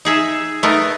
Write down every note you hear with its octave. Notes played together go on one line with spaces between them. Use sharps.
D#4 G#4 E5
A3 B3 D#4 A#4